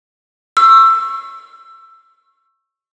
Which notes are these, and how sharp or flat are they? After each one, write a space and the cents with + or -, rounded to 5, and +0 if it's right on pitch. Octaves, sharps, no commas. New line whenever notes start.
C#6 -20 E6 +15